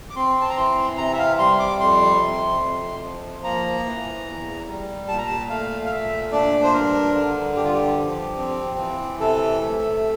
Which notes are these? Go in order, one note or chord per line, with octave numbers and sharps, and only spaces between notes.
D6
C4 C6
A5
A#5
E3 C6
C3 A#5
E5
F5
G3 C6
D6
F2 C6
C3
F2
F3
A#3 A#5
E3
E2
G3
A#2 A5
A#5
A5
A3 F5
F5
A#2 E5
D4 D5
C5
G2 A#4
D3
G2 G4
F4
G4
F3
C4
E3
C3 A4
A3